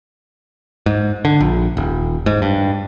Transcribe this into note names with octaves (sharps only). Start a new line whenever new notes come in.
G#2
D3
A#1
D#1
G#2
G2